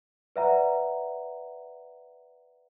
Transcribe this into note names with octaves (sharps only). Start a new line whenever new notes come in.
B4 D5 E5 F#5 A#5